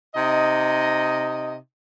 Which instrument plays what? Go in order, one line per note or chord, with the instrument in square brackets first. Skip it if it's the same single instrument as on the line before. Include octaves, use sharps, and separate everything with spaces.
[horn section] C3 D#4 D#5